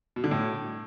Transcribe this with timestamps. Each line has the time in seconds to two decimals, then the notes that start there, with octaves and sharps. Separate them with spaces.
0.16 B2
0.24 D3
0.31 A2